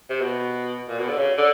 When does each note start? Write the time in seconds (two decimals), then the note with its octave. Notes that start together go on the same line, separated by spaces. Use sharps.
0.10 C3
0.21 B2
0.88 A#2
0.99 B2
1.09 D3
1.18 C#3
1.37 D3